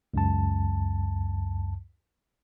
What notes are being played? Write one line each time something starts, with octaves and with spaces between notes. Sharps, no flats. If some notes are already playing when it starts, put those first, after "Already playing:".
C#2 F#2 A5